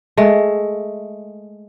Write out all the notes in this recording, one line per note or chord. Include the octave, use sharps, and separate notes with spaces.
G#3 A3